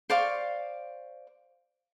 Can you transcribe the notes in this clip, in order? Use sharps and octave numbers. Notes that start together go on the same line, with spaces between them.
C5 D5 F5 C#6